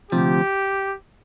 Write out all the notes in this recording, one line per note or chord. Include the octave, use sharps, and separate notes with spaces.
D2 C3 F3 G4